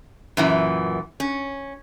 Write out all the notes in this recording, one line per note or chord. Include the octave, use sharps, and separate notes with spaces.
F#2 A#2 E3
C#4